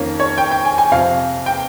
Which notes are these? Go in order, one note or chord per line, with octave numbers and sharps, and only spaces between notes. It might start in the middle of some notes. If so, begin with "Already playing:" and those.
Already playing: F2 D#3 A#3 C#4
C#5
G5
G5
G#5
G#5
F2 C3 F3 C4 F5
G5